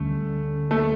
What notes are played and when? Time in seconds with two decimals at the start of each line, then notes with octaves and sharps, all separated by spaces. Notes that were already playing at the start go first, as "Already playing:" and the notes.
Already playing: D2 D3 G3 A3 C#4
0.71 A3